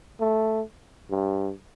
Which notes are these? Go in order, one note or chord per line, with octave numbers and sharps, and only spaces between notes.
A3
G2